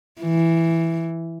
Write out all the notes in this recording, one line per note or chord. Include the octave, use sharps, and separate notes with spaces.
E3